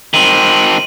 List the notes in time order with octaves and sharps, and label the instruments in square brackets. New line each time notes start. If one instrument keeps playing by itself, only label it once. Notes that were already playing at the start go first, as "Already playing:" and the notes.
[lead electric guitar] D#3 C4 [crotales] D#7 F#7